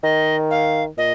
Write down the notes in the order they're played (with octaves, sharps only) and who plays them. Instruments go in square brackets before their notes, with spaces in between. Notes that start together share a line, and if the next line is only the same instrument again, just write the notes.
[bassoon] D#3 [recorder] D#5
[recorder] F5
[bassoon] A#2 [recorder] D#5